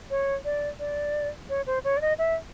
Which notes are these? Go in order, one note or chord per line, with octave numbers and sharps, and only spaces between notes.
C#5
D5
D5
C#5
C5
C#5
D5
D#5
E5